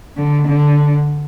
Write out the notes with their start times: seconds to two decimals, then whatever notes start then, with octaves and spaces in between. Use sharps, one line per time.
0.17 D3
0.47 D3